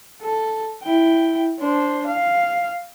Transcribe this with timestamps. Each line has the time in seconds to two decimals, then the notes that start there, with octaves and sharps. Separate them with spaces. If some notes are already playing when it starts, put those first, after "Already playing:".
0.22 A4
0.84 E4 G5
1.59 D4 C5
2.07 F5